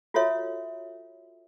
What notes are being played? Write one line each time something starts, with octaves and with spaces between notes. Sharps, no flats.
F4 F#4 A4 C#5 E5